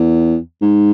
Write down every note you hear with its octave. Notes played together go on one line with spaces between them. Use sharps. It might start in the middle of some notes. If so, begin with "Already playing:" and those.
Already playing: E2
G#2